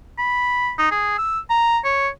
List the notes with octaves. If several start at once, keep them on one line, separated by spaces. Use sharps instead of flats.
B5
D#4
G#4
E6
A#5
C#5